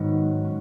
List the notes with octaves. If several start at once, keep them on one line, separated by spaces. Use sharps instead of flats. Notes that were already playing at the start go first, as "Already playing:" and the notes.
Already playing: G#2 D#3 F#3 B3 F#4
C#4